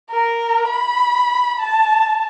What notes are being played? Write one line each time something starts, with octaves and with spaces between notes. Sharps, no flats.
A#4
B5
A5